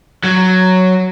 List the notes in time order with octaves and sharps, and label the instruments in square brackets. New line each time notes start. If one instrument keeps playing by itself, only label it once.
[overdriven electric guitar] F#3